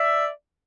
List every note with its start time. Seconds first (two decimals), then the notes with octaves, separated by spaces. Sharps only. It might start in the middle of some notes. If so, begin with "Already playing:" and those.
Already playing: D5 E5